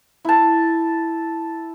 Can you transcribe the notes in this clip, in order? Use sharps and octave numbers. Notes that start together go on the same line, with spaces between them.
E4 A5